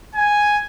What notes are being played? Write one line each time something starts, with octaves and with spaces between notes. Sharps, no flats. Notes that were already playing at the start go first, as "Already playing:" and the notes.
G#5